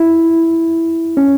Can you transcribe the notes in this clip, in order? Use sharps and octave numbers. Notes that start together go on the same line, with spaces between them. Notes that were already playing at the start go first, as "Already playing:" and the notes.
Already playing: E4
C#4